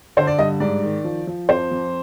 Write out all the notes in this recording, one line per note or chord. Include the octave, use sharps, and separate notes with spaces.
D3 C5
D5
G2 D#5
G#2 D5
D#3
F3
F3
F2 C5
F2